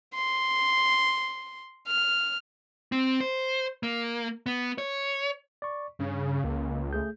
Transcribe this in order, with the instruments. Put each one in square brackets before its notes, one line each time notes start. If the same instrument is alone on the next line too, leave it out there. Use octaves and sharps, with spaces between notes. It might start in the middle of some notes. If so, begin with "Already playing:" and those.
[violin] C6
F6
[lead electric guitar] C4
C5
A#3
B3
C#5
[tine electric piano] D5 C#6
[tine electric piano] G2 [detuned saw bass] C#3
[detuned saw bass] C#2 [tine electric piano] A#3
[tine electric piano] A3 G#4 G6